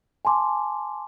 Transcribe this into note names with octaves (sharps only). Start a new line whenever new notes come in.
G#5 A5 C6 D6